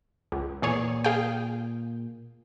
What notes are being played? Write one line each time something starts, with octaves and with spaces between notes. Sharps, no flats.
C#2
E2 A#2 G#4 C#5
G#4 F5 G5